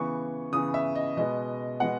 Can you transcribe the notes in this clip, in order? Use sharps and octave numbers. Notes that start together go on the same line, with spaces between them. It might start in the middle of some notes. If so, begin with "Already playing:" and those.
Already playing: C#3 E3 B3 C#6
C#3 E3 B3 D#6
E5
D#5
B2 G#3 B3 D#5
B2 G#3 B3 F#5